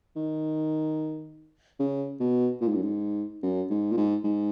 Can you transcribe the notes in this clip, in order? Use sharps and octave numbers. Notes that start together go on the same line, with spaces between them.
D#3
C#3
B2
A#2
G#2
F#2
G#2
F#2
G#2
A#2
G#2
G#2